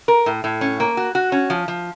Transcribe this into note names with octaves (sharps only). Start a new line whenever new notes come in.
A#4
A2
A2
C#4
A#3
F#4
F#4
C#4
F3
F3